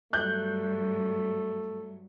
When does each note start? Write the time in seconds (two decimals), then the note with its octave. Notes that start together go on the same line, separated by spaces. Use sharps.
0.13 G2 F#3 A3 F#6 G6